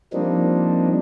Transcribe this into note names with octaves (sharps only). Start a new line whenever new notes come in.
F3 G3 A#3 C4 D4 D#4